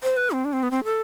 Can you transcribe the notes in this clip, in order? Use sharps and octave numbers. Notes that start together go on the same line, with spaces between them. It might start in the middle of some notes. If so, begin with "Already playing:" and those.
C5
B4
C4
D4
C4
B3
C4
A4